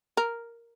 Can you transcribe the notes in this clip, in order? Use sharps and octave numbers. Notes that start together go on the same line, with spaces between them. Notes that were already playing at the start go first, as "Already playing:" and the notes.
A#4